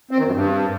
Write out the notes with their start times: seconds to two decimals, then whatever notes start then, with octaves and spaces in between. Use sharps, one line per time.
0.11 C4
0.19 D#3
0.26 F#2
0.34 G2